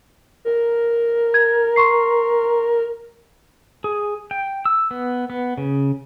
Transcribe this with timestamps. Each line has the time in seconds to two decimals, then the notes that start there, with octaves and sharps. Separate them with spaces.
0.45 A#4
1.34 G#6
1.76 C6 C#6 C7
3.84 G#4
4.31 G5
4.65 E6
4.91 B3
5.30 B3
5.58 C#3